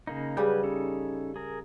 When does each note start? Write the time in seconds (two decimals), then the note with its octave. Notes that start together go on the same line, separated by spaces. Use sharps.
0.07 C#3 A#3 D#4
0.37 C#3 F#3 G3 B4 G6
0.63 C#4 D#4 A4
1.36 G#4 A#4